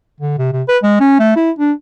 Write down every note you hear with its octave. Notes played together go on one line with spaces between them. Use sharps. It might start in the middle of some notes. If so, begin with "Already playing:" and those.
D3
C3
C3
B4
G#3
C#4
A3
E4
D4